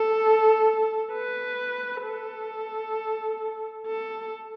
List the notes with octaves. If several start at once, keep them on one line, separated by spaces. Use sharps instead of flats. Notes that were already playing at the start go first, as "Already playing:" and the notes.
Already playing: A4
B4
A4
A4